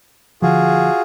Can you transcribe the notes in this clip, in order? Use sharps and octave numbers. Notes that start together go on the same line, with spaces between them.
D3 F3 F4 F#4 G#4